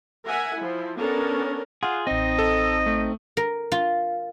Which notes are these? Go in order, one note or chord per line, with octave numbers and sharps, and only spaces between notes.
A#4 E5 F#5 G#5
F3 E4
B3 C#4 D4 A4 A#4
F4 G#4 F5 F#5 C6
A1 C4 D#4 D#5 D#6
A4
A3
A#4
F4